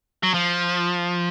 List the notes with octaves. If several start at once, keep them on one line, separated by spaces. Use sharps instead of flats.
F#3
F3